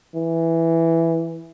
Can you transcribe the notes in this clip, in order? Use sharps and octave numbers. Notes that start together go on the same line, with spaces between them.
E3